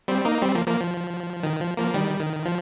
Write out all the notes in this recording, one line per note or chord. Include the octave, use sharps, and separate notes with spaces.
G3 C4
A#3 D#4
G3 C4
F3 A#3
F3 A#3
F3
D#3
F3
F3 A#3
D#3 G3
D#3
F3